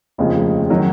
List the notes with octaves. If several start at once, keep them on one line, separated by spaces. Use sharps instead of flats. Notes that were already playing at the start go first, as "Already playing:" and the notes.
F1 D#2 C#3 F3 G#3
D#3 F#3 C#4